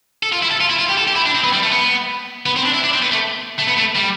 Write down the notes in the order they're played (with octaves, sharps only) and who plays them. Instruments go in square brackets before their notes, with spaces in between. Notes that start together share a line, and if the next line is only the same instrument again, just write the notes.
[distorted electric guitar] A4
F4
E4
A4
F4
E4
F4
G4
A4
G4
E4
D4
C4
B3
G3
A3
B3
B3
C4
D4
E4
D4
C4
B3
A3
A3
B3
A3
G3